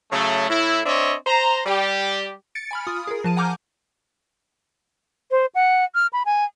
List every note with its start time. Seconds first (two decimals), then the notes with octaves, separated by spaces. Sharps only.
0.12 C#3 F#3 A3
0.50 A2 E4
0.86 C4 D4 C#5 D#5 E5
1.27 C5 A#5
1.66 G3 G4
2.55 A6 C#7 D7
2.71 G#5 B5 F6
2.87 F4 D#6
3.07 G#4 A#4
3.24 F3 A5 D#7
3.37 F#5 G#5 A#5 D6 F6 G6
5.31 C5
5.55 F#5
5.95 F6
6.13 B5
6.26 G#5